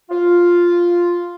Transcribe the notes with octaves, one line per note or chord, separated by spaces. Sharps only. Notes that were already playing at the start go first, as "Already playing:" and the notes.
F4